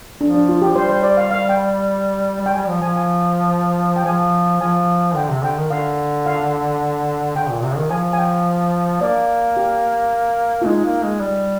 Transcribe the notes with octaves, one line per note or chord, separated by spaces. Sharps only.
F3 D4
D4
F4
G4
F3
G3 C5
C5
D5
F5
F5
G5
G3
G5
G3 G#5
F3
F3 G#5
G#5
G5
F3 G#5
F3 G#5
D3 G5
C3
D3 G5
D#3
D3 F5
F5
D3 G5
A#2
C3
D#3
F3 G#5
G#5
G5
A#3 D5
G4
F4
G#3 D#4
A#3
G#3
G3